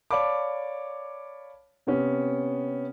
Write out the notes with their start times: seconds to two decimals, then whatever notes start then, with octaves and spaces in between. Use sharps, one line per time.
0.11 C#5 D5 F5 A5 B5 D6
1.87 C3 B3 C#4